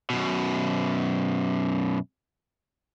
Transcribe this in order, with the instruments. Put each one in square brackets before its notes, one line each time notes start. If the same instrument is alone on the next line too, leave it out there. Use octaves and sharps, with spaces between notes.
[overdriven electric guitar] F#2 B2